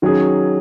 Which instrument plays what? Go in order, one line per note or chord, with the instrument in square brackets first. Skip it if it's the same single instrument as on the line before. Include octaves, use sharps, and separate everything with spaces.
[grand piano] D#3 F#3 C#4 G#4